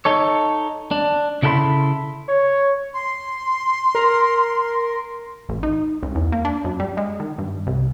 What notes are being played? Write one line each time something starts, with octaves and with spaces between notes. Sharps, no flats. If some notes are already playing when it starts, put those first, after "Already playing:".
D#4 A4 C#5
D4
C#3 E4 A4 F5 B5 C6
C#5
C6
A#4
A1
D#4
C#2
E2
A#3
D4
F#2
G3
G#3
D#3
G2
C2